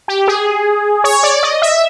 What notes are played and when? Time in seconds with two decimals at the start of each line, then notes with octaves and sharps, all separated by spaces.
0.08 G4
0.28 G#4
1.04 C#5
1.23 D5
1.43 D#5
1.62 E5